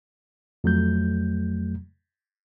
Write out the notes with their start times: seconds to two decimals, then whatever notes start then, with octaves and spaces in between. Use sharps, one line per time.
0.64 F2 F#3 A3 G6